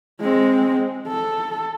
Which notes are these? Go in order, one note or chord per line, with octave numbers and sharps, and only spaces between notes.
G#3 C4
A4